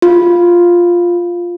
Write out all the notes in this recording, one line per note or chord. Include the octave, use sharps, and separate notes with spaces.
F4